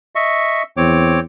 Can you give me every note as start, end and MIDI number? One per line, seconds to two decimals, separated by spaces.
0.15 0.63 75
0.15 0.63 76
0.15 0.63 85
0.77 1.20 40
0.77 1.20 60
0.77 1.20 73
0.77 1.20 86